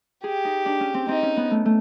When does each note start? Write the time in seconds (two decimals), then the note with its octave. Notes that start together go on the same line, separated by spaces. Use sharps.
0.24 G4 G#4
0.45 D#4
0.66 D4
0.80 C#4
0.94 C4
1.08 C4 D#4
1.22 C#4
1.37 B3
1.51 A3
1.65 A3